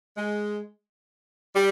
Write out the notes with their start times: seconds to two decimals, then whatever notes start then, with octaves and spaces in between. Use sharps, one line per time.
0.16 G#3
1.55 G3